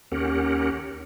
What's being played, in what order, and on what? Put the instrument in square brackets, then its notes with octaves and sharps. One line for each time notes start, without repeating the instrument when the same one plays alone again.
[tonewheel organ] D#2 C#4 G4 A#4 F#5